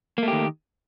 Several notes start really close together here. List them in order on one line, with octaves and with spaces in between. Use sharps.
A#3 A3 G4 D#3